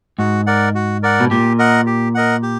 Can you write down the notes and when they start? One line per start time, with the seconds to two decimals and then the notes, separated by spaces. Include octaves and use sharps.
0.19 G#2 F#4
0.47 A#4 D5 F#5
0.75 F#4
1.03 A#4 D5 F#5
1.20 B2
1.30 A#2 G4
1.59 A#4 D#5 F#5
1.86 G4
2.15 A#4 D#5 F#5
2.43 G4